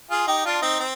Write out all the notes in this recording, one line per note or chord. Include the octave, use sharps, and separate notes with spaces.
F4 G#4
D#4 G4
D4 F4
C4 D#4
C4